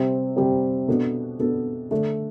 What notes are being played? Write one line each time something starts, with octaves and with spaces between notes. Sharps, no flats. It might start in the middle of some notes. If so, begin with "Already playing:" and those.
Already playing: C3 G3 C4
C3 G3 C4
B2 B3 D4 A4
B2 B3 D4 A4
D3 A3 D4 A4